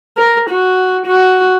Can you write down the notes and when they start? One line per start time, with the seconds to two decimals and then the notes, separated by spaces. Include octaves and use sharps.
0.17 A#4
0.50 F#4
1.06 F#4